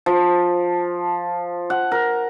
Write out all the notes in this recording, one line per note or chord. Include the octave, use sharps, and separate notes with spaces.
F3
F#5
A#4